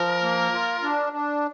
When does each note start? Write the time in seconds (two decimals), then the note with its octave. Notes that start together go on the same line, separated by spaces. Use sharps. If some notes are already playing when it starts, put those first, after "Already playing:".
Already playing: F3 A#4
0.23 A#3
0.54 F4
0.83 D4
1.13 D4